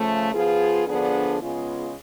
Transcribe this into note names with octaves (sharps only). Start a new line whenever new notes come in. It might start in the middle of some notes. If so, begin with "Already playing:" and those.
Already playing: C#3 F3 A3
F3 B3 F4 G#4
D3 F3 B3 D4 G#4
C#3 G#3 B3 F4 G#4